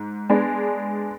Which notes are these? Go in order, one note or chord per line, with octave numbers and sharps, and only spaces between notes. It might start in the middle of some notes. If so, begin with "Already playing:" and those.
Already playing: G#2
G#3 B3 D4 G#4